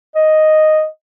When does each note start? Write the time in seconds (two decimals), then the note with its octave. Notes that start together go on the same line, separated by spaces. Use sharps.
0.15 D#5